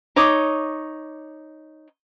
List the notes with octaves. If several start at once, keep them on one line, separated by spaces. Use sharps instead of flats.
D#4 C#5 D6 D#6